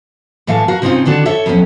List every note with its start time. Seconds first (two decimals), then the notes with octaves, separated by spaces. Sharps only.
0.47 A2 E3 A3 E5 F5 A5
0.68 F#4 A#4 F5
0.82 C3 C4 C#4 D#4 F4
1.05 D3 D#3 D4 F#4
1.26 A4 C#5 E5
1.46 F2 B2 F#3 C#4